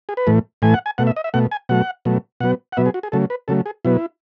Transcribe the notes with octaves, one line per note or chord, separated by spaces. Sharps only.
G#4
B4
A2 E3 A3
A2 E3 A3 G#5
F#5
G#5
B2 A3 F#5
E5
D#5
E5
B2 A3 F#5
G#5
B2 F#3 A3 F#5
B2 F#3 A3
B2 F#3 B3 F#5
F#5
B2 F#3 B3 E5
G#4
F#4
G#4
C#3 F#3 A3 A4
B4
C#3 F#3 A3 A4
G#4
B2 F#3 B3 E4